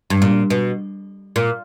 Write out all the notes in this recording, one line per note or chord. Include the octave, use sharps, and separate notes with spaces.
G2
A#2
B2
A#2